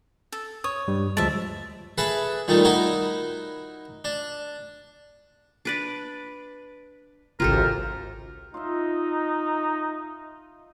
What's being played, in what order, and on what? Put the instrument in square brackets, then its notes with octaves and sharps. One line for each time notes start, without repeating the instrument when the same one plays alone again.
[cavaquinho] A4
[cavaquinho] C#5 [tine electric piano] D#6
[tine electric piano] G2 G3
[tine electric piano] D2 F3 G#3 [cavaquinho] E5 A5
[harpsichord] G#4 A4 B4 E5
A#2 D#3 G3 A3 D#4
D#4 E4 F#4 A#4 D#5
D4
[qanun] D4 B4 D5
[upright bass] G#1 C#2 [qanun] F4 G4 A4 [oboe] A#4
[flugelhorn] D#4 [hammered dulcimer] F4 D#5 E5